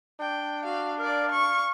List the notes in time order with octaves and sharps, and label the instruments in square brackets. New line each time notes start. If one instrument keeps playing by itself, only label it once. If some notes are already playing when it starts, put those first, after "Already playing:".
[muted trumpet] D4 [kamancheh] G5
[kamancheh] F#4 F5
[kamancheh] A#4 D5 [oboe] F5
[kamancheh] C#6